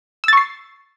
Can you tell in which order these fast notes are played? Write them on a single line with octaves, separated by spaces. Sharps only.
E6 A6 C#6 C7